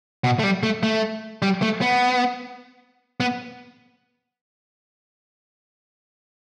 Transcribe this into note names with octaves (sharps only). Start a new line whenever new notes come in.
B2
A3
G3
A3
A3
G3
A3
B3
B3